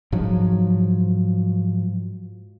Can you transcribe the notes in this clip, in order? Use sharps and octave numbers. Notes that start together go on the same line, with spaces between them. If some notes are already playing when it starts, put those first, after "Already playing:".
G#2 F3 F#3